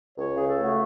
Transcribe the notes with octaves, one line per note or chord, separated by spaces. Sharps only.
C#2 C#5
C#3 G#4
A4
A3
F#4